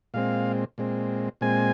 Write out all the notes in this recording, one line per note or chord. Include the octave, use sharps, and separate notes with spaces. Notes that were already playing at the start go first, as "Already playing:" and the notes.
A#2 G#3 C4 F5
A#2 G#3 C4
A#2 G#3 C4 G#5